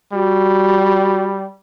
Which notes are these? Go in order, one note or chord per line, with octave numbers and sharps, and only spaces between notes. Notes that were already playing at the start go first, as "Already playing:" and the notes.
G3 F#4